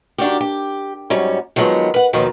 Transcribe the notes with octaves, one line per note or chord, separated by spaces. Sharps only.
D#3 D4 F#4 G4
G4
G#2 F#3 G3 C#4
D#3 F3 F#3 G#3 B3
B4 F#5
D#2 B2 D#3 F3 F#3